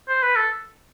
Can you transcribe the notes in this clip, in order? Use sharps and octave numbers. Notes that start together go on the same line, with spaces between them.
C5
B4
A4